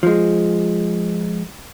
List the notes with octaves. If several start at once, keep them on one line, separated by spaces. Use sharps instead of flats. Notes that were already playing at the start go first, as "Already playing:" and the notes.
F3 G#3